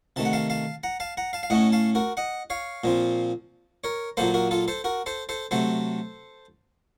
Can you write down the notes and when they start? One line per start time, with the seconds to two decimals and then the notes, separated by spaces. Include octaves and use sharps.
0.16 C3 D#3 A3 A5
0.25 F#5
0.33 F5 A5
0.50 F5 A5
0.83 F#5 A#5
1.00 F5 A5
1.17 F#5 A#5
1.33 F5 A5
1.43 F5
1.50 A2 A3 C#4 D#5 F#5
1.72 F5 A5
1.95 F#4 A#4
2.17 D#5 F#5
2.50 C#5 F5
2.84 A#2 F3 C4
3.84 A#4 C#5
4.17 A#2 F#3 A#3 A4 C5
4.34 F#4 A#4
4.51 F4 A4
4.68 A4 C5
4.84 F#4 A#4
5.06 A4 C5
5.29 A4 C5
5.51 C3 F#3 A3 A4 C5